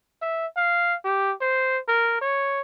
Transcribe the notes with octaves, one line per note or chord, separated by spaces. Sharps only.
E5
F5
G4
C5
A#4
C#5